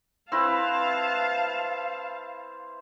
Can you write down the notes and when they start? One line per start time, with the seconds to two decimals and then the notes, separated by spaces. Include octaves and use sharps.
0.32 C4 E4 B4 F5 A5